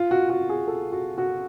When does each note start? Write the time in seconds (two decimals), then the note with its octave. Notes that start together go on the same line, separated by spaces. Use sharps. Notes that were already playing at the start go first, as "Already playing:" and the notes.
Already playing: F4
0.11 F#4
0.30 F#4
0.49 G#4
0.67 A4
0.92 F#4
1.18 F#4